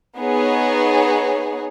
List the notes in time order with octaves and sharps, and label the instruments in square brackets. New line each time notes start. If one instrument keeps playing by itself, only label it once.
[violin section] B3 D#4 G#4 C#5